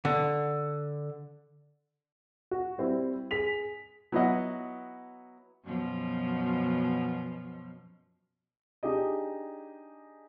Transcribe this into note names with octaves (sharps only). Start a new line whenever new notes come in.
D3
F#4
G3 C4 E4
G#4 B6 F7
F#3 B3 E4 F#4 D#5 F#5
F#2 B2 F3
D4 D#4 G4 G#4 D#5